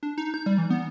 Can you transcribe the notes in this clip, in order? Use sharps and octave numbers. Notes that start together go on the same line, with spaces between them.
D4
D#4
G6
G3
E3
B3